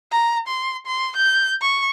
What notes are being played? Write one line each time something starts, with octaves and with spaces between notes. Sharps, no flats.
A#5
C6
C6
G6
C#6